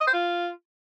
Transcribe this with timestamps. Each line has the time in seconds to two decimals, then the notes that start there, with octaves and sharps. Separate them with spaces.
0.01 D#5
0.07 C5
0.13 F4